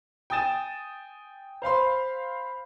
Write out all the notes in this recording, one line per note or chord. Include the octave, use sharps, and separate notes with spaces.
G5 G#5 D#6 A6 E7
C5 F5 B5 C6